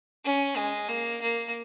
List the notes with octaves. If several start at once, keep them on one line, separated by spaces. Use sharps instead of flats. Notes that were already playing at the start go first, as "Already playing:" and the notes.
C#4
G#3
A#3
A#3